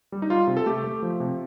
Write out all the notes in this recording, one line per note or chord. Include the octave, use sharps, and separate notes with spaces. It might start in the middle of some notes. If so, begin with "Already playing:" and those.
G3
D#4
G3 F4
C3
A4
A3 G4
A3
F3
C3